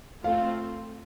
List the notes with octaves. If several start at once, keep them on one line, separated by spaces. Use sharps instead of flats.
A3 C4 F4 A4 F5